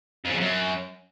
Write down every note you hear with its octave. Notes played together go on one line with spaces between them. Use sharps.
F2
C#3
F2
F#2